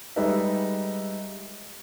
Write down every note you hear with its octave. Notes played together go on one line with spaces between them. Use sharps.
G3 G#3 D#4 A4 B4 E5